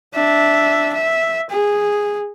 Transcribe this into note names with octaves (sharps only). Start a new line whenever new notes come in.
D4 E5
E5
G#4